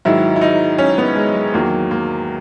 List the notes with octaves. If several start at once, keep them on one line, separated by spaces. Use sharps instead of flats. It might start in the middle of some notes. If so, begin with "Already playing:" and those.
G#2 D#3 F#3 E4
E4
D#4
C#4
B3
G#3
G#3
E2 D#3 F#3 A#3
A#3